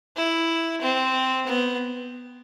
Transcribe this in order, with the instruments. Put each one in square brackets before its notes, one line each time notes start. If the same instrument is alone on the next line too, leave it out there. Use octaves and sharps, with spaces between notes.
[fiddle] E4
C4
B3